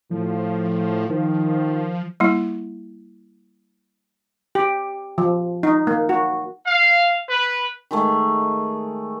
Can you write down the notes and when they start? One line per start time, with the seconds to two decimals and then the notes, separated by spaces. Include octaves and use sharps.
0.11 A2 F3
1.10 D#3 F3
2.20 G3 A#3 E4
4.55 G4
5.18 F3
5.63 D#4
5.87 A#3
6.09 F#4
6.67 F5
7.29 B4
7.91 D#3 G#3 A3